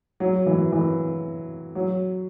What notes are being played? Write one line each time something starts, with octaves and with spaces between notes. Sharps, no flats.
F#3
E3
E3
F#3